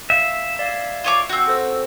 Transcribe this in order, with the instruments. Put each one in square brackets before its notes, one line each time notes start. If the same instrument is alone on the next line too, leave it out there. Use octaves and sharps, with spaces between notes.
[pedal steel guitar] E5 [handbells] F5
[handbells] D5 F5 G#6
[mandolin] F4 C#5 D6
[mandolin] C4 F#4 [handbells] G6
[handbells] A4 C5 E6